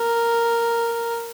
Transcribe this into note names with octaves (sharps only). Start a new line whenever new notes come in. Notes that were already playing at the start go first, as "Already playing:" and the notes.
Already playing: A#4